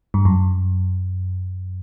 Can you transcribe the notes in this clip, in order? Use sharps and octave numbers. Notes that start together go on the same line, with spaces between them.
G2
F#2